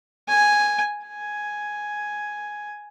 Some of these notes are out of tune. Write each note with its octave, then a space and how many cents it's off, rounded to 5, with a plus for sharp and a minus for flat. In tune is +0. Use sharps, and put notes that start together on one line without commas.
G#5 +0
G#5 +5